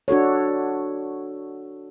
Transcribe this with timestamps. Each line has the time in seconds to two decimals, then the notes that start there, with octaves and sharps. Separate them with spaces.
0.08 D4 F#4 A4 C#5